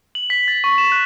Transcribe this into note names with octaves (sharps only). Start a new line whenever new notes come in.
F#7
B6
A6
C#6
E7
F#6